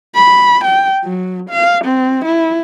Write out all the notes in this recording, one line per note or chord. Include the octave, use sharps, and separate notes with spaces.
B5
G5
F#3
F5
C4
E4